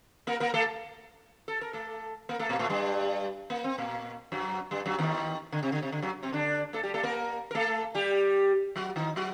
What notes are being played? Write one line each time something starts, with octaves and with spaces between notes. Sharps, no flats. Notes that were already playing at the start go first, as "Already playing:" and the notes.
A#3 A#4
A#3 A#4
A3 A4
A4
A#4
A3 A4
A#3 A#4
A3 A4
A#2 A#3
A2 A3
G2 G3
A#3
C4
A#2 A#3
F#2 F#3
G2 G3
F#2 F#3
D#2 D#3
D3
C3
D3
C3
D3
F#2 F#3
C3 C4
D3 D4
A3 A4
G3 G4
A3 A4
A#3 A#4
A#4
A3 A4
G3 G4
F#3 F#4
D#3 D#4
F#3 F#4